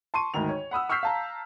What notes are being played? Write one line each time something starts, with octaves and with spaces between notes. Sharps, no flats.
A5 C6 C#6 D#7
D2 G#2 D#3 F7
C#5
F#5 B5 D#6 E6
C#6 E6 F6 G6 B6 C7
F5 A5 A#5